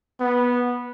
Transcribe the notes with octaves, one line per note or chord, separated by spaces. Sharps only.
B3